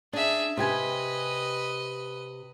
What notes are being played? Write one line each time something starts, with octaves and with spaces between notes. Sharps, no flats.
D4 G#4 E5
C3 G4 B4 D#5 G#5